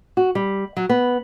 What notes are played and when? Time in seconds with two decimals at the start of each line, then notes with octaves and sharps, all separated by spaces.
0.17 F#4
0.35 G3
0.77 F#3
0.89 B3